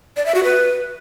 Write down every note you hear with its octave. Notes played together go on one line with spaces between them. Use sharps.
D5
E5
F#4
B4